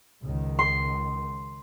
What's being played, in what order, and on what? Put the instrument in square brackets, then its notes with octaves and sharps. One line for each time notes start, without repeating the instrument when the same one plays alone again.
[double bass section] C#2 D#3
[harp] C6